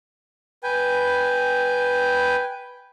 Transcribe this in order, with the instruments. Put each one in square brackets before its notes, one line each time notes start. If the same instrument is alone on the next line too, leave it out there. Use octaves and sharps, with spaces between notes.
[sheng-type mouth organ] B4 G5 G#5